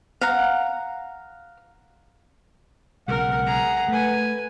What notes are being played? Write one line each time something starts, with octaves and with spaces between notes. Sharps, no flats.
F5 F#5 A#5
B1 C#3 G#3 A#4 F#5
G#4 A#5
A3 B4 G#5